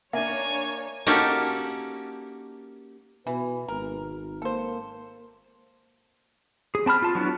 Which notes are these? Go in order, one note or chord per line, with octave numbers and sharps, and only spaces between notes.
A#3 D4 C#5 E5 G#5
A#3 C#4 D#4 F#4 G4 A4
B2 E3 B4
G#1 A#4
A#3 A4 C5
G#4
C4 A5 B5 F6
F4 A5
F#3 B3 D4 E4 F#4